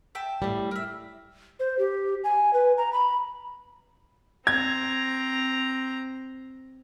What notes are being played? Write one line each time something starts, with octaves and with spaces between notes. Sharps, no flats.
E5 G5 A5
A2 G3
A#4 E5
C5
G4
G#5
B4
A#5
B5
C4 A#5 G#6